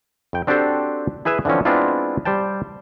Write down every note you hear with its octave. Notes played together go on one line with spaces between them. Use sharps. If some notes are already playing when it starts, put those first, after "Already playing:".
F2 G5
C4 D4 F#4 G4 A4 C5
E4 G#4 B4 E5 G#5
D3 E3 F3 C4 C#4
G#3 B3 C4 D4 E4 F4
G3 C5 G5 A5